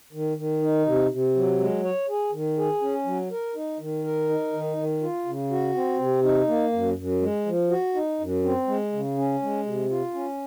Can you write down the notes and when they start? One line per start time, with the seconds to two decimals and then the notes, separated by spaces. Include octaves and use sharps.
0.13 D#3
0.37 D#3
0.62 D#4
0.86 C3
1.11 C3
1.35 F#3
1.59 G#3
1.84 C#5
2.09 G#4
2.32 D#3
2.58 G#4
2.82 C#4
3.06 F#3
3.31 A#4
3.55 D#4
3.79 D#3
4.04 A#4
4.29 D#4
4.53 D#3
4.77 D#3
5.02 F4
5.25 C#3
5.51 F#4
5.74 C4
5.99 C3
6.23 D#4
6.48 A#3
6.73 F#2
6.97 F#2
7.22 G#3
7.46 F3
7.70 F#4
7.95 D#4
8.20 F#2
8.44 C4
8.68 G#3
8.93 C#3
9.17 C#4
9.42 G#3
9.66 C3
9.90 F4
10.14 C#4